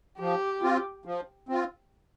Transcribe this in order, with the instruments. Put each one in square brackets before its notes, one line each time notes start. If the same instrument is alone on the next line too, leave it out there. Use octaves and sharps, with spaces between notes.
[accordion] F3 [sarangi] G4
[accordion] C4 F4
F3
C4 F4